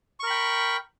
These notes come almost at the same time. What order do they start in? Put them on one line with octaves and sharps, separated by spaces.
C#6 A#4 B5 G5